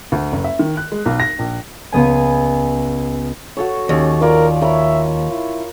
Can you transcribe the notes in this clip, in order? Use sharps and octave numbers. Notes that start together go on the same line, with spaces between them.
D2
F#1
E5
D#3
F#6
G#3
B1
A#6
A#1
C#2 B3 G#5
F#4 A4 C#5
D#2 C#4
F4 A#4 C#5 D5
A#4 C#5 E5 B5
E4